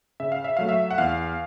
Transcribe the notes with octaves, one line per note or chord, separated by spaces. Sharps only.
C#3 E5
F5
E5
F#3 A3 F5
E5
F#5
E2 F5